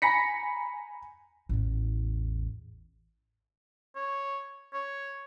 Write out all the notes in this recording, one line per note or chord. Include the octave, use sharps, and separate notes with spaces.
G#5 A#5 B5 A#6 B6 C#7
A1 E2
C#5
C#5